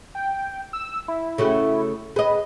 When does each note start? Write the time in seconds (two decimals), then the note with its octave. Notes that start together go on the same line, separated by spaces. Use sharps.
0.15 G5
0.73 E6
1.08 E4
1.38 C#3 A3 F#4
2.16 G#4 B4 D#5